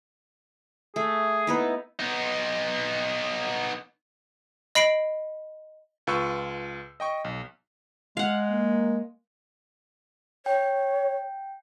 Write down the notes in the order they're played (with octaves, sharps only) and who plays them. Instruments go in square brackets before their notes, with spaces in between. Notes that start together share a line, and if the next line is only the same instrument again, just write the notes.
[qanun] A3 [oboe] G#4
[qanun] B3 D#4 E4
[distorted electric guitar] B3 D#4
[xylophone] D#5 B5 C7 D7 F#7
[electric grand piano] C#2 F4 B4 C#6 E6 C#7
D#5 G5 C#6
B1
[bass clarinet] G#3 [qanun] F5 F#5
[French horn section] A#3
[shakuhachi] C#5 [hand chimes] G5